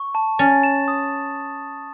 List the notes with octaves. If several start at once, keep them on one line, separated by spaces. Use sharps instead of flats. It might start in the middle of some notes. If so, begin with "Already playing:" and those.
Already playing: C#6
A5
C#4 A6
E7
D#6